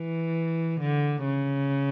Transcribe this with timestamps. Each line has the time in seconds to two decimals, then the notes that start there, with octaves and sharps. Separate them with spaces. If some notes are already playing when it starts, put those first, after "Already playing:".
Already playing: E3
0.80 D3
1.24 C#3